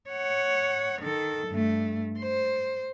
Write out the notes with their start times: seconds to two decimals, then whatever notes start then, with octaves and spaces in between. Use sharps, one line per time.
0.10 C#5 F#5
1.01 D#3 A4
1.48 G2 A3
2.20 C5